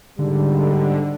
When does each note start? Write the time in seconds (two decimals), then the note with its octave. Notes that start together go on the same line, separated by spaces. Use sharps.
0.19 G#2 D3 G3